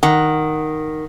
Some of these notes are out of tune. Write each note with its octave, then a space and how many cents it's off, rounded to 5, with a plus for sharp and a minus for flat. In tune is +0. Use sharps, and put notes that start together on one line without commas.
D#3 +0 F#5 +0